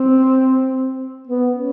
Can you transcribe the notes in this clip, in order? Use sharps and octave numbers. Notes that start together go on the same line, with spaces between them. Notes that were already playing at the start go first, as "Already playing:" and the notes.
Already playing: C4
B3
C#4